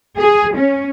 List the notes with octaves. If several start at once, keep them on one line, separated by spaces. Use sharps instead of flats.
G#4
C#4